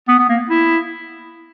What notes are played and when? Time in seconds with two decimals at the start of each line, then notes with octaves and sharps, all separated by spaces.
0.08 B3
0.19 B3
0.29 A#3
0.49 E4